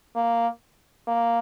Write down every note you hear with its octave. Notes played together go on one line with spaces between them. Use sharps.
A#3
A#3